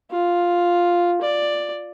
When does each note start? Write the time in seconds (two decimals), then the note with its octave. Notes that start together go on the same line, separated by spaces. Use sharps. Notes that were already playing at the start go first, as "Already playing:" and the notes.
0.11 F4
1.21 D5